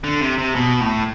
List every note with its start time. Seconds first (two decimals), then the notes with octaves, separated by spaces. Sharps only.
0.04 D3
0.21 C3
0.38 C3
0.55 B2
0.81 A2